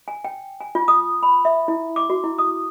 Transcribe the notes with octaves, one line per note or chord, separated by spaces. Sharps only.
G#5
G5
G#5
F4
D#6
B5
E5
E4
D6
F#4
E4
D#6